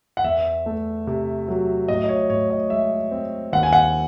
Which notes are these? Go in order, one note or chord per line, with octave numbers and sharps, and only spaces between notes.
F#5
E2 E5
A3
C3
F#3
A2 D#5
D#5
C#5
A2 C#5
D#5
G#3 E5
C4
D#2 F#5
G#5
F#5